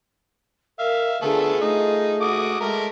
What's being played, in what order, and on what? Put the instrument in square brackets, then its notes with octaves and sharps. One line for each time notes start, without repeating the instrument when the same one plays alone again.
[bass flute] A#4 [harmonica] E5 F5
[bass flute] D3 [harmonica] A3 B3 A4 [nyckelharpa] F4 G#4
[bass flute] A3 [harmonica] D#4
[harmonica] F#4 D6 D#6
[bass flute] G#3 [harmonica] A3 A#4 A#5